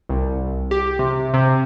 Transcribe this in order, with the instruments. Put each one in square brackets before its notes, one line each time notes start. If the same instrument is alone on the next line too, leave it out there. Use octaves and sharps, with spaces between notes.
[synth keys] C2
G4
C3
C3